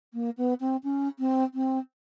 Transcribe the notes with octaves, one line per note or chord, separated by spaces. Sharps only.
A#3
B3
C4
C#4
C4
C4